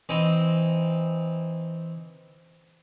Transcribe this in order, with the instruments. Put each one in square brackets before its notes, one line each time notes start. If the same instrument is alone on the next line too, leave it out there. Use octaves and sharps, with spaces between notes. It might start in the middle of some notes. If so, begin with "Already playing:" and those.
[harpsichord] E3 C4 D#4